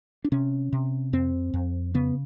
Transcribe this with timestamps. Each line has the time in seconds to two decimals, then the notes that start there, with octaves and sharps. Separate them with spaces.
0.24 D4
0.32 C3 C#4
0.73 C3
1.13 F2 C4
1.54 F2
1.94 C#3 B3